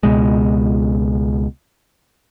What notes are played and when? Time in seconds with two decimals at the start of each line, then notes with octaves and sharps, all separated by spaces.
0.03 C#2 B2 G#3